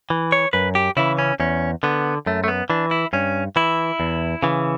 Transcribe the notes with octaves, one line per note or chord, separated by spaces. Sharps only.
E3
C#5
F#2 B4
G4
C#3 E3 E4
C#4
E2 C#4
D3 B3
F#2 A3
A3
B3
E3 D4
E4
G2 C#4
E3 E4
E2
C#3 E3